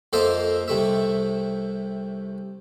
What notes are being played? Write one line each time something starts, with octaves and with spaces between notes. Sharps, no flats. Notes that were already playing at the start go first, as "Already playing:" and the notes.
F2 A#3 A4 C5 D#5 E5
C2 C3 A3 E5